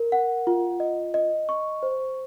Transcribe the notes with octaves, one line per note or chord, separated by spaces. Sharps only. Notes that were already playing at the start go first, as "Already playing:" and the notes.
Already playing: A#4
F#5
F4
D#5
D#5
C#6
C5